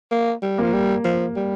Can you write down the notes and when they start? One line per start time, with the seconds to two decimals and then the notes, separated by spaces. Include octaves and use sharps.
0.11 A#3
0.43 G3
0.58 F3 A#3
0.73 G3
1.04 F3
1.36 G3